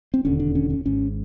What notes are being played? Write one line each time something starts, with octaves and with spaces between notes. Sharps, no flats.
C4
E1 D#2 D3 C#4
D4
C#4
C#4
G#1 G#2 C#4